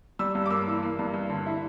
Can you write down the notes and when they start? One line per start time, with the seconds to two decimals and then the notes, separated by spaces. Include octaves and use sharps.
0.19 G3 E6
0.35 G2
0.46 D6
0.50 A#3 E6
0.67 E3
0.83 A#3
0.99 G2
1.14 G2
1.29 D3
1.46 E4